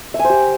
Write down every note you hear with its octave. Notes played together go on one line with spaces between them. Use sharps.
E5
G#5
C5
G4